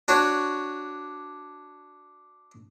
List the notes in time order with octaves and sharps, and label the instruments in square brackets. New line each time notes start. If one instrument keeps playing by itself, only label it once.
[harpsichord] D4 F#4 C#5